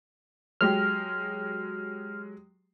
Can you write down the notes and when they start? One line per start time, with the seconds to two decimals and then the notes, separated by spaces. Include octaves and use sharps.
0.61 F#3 G#3 G4 F6